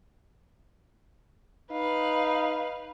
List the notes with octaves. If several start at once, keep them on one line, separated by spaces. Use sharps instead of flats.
D#4 B4 F5